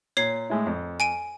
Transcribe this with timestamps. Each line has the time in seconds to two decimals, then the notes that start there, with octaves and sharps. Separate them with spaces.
0.17 A#2 C#5 C7
0.50 A2 G#3 E4
0.67 F2
1.00 G#5 D7 D#7